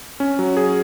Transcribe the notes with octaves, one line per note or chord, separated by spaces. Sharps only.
C#4
F#3
G#4